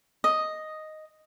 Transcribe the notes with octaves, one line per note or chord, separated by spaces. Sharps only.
D#5